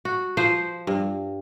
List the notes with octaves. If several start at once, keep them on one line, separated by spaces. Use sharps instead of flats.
F#4
F3 C5
G2